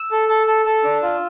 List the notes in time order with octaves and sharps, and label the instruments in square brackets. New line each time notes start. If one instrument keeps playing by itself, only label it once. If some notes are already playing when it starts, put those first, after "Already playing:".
Already playing: [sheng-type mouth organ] E6
A4
A4
A4
A4
D4
F4